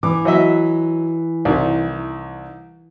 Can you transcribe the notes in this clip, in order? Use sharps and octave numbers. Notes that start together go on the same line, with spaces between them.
E3 D6
F#3 D#5 E5
C2 D#3